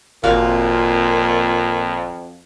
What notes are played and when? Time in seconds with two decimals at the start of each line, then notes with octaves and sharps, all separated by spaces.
0.24 G#1 F2 A#2 F#4 F5